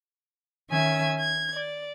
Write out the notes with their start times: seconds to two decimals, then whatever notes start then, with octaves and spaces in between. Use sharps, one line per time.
0.70 D#3 C#4 E5 G#5 G#6
1.18 G#6
1.53 D5